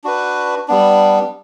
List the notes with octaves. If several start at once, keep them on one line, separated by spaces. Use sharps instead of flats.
D4 F#4 B4
G3 B3 D4